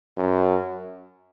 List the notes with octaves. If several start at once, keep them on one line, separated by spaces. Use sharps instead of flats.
F#2